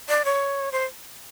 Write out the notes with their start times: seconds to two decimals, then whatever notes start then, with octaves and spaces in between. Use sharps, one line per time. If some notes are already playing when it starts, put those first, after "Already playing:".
0.08 D5
0.25 C#5
0.72 C5